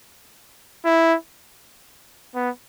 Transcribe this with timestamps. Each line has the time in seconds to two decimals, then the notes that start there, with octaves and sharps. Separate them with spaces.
0.85 E4
2.35 B3